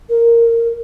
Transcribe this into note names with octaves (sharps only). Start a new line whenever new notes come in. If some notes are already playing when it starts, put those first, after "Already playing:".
A#4